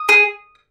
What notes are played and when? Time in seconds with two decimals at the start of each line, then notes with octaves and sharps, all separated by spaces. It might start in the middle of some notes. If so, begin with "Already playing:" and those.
Already playing: D#6
0.09 G#4